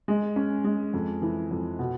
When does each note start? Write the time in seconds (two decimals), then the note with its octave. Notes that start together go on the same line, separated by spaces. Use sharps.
0.08 G#3
0.36 C#4
0.65 G#3
0.93 F2
1.22 E3
1.51 F2
1.79 B2